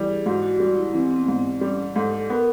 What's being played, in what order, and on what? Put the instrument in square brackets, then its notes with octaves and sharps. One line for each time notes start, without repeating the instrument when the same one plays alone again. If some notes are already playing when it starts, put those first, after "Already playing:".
Already playing: [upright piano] E3 G3
[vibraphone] G#4
[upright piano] G#2 [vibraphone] F#4
[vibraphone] F#4
[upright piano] G3 [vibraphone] F#4
[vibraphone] E4
[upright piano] E3 [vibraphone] C4
[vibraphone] C4
B3
[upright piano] G#2
[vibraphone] C4
[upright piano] G3 [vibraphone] C#4
[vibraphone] G4
[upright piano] G#2 [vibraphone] A4
[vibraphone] A4
[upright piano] B3 [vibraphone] A#4